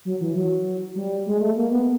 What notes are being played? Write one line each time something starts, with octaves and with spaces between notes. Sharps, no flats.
F#3
E3
F#3
G3
G#3
A3
A#3
B3